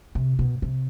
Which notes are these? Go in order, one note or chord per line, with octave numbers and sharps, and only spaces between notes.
C3
B2
C3